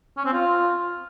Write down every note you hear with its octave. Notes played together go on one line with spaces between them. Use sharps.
C#4
C4
F4